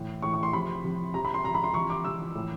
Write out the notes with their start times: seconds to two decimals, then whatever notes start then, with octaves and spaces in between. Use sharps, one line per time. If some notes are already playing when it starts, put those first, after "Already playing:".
Already playing: A2 E3
0.22 A2 E3 C#6
0.34 C#6
0.43 C6
0.53 C3 F3 B5
0.84 C3 F3
1.14 C3 F3 A#5
1.25 B5
1.34 C6
1.44 C3 F3 A#5
1.54 B5
1.64 C6
1.74 C3 E3 C#6
1.90 D6
2.04 C3 E3 E6
2.35 A2 E3